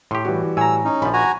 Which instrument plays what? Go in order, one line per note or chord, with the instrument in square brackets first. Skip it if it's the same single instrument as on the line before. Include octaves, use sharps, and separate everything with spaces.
[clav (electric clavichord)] A2 G4 [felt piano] C6
[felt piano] E3 G3 F#4
[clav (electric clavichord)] A2 [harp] G#5 A#5 [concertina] E6
[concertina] C#4 D#4
[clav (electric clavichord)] A#1 F3 [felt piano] B5
[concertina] F#4 G#5 A#5